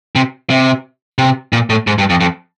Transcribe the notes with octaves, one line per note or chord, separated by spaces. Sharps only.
C3
C3
C3
A#2
A2
G#2
G2
F2
F2